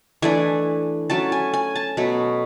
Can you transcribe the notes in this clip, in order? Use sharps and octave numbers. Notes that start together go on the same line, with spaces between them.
E3 A3 D4 G#5
F#3 A3 C#4 A5
G#5
G#5
A5
B2 F#3 A3